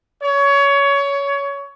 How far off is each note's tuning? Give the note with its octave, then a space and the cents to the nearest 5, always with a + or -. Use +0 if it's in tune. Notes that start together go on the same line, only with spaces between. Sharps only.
C#5 +20